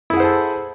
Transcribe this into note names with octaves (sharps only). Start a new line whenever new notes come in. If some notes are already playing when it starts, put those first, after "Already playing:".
E4 G#4 A4 C5 F#5